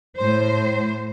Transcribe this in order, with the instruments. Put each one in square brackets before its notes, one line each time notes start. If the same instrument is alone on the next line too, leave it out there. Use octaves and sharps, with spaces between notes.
[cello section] A2 C5